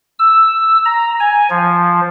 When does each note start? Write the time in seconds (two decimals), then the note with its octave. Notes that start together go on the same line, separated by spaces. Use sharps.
0.19 E6
0.85 A#5
1.20 G#5
1.50 F3